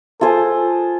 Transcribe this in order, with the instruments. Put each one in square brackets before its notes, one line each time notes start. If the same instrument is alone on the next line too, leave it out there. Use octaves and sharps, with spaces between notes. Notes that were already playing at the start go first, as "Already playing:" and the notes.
[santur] F4 G#4 C5 [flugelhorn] A4